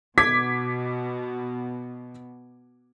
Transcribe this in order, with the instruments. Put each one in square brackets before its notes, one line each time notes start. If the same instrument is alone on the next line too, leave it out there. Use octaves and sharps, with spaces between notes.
[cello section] B2 [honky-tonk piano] D6 G#6 B6